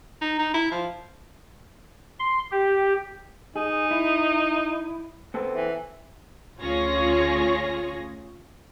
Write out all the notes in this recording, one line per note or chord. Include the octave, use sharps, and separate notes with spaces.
D#4
D#4
E4
F3
C6
G4
D#4 G#4
E4
B3 C4 A4
E3
D2 C#4 F4 G#4 C#5 A#6